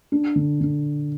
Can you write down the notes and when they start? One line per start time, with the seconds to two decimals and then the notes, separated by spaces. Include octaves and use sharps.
0.12 D4
0.36 D3
0.61 D3